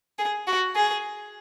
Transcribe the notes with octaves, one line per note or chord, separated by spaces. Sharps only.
G#4
F#4
G#4